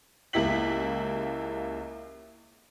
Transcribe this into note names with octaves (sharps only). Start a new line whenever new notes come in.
C#2 A#3 E4 G4 B6 F#7